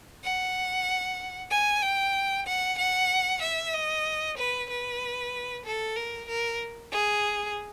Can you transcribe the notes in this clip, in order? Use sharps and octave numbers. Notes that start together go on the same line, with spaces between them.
F#5
G#5
G5
F#5
F#5
E5
D#5
B4
B4
A4
A#4
A#4
G#4